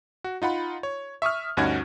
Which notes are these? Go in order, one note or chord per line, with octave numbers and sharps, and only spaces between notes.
F#4
D#4 F4 F#5 B5
C#5
E5 C#6 D#6 F6
D2 G2 C#4 D#4 F#4 G#6